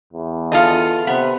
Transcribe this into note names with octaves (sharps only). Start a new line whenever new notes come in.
E2
F4 A4 D#5
C3 B3